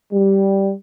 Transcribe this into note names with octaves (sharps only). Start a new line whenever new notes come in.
G3